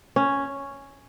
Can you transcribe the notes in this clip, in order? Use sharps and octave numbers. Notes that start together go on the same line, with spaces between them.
C#4